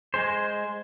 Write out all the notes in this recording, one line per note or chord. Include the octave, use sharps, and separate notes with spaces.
G#3 G#4 C5